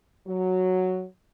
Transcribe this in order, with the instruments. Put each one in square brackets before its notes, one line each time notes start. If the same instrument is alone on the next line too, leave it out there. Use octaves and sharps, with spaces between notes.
[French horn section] F#3